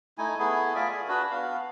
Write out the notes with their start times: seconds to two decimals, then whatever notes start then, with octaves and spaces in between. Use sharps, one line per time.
0.18 A3 D#4 E4 G#5
0.39 A3 B3 E4 G#4
0.75 F4 D5 E5 G#5
0.90 G#4
1.08 D4 F#4 B4
1.31 B3 F5